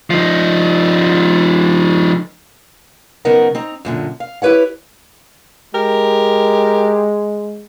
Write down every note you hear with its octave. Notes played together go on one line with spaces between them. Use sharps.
F3 D#4
C#3 F#3 B3 D#4 A#4 F#5
C4 D#4 A#5
F#2 A#2 D3
F5
E4 G4 B4 C#5 F#5
G#3 G4 A#4